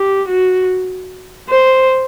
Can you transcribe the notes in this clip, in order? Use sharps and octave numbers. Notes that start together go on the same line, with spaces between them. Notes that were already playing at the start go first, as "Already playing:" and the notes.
Already playing: G4
F#4
C5